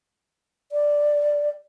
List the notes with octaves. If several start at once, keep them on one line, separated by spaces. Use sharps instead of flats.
D5